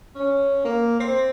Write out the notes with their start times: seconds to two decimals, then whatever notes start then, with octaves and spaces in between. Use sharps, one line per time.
0.16 C#4
0.65 A#3
0.99 C4